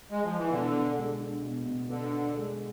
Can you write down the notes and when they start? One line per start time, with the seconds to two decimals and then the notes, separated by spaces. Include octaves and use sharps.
0.11 G#3
0.24 F3
0.37 E3
0.50 B2 D3
0.73 B2
0.97 G#3
1.20 D4
1.42 B2
1.66 B2
1.89 D3 B3
2.13 D4
2.37 G#3